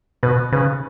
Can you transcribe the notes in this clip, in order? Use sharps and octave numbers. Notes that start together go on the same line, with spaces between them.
B2 B4
C#3 B4